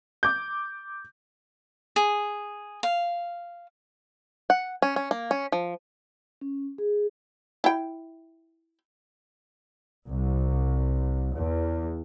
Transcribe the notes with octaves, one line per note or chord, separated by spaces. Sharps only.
D6 G6
G#4
F5
F#5
C#4
C#4
A#3
C#4
F3
C#4
G#4
E4 G5
C2
E2